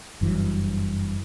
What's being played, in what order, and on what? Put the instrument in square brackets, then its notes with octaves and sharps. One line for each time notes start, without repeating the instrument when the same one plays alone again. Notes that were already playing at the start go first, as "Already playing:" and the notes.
[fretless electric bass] F#1 G2 E3 F#3